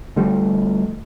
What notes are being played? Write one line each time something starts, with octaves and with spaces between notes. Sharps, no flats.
D3 F3 G3 A3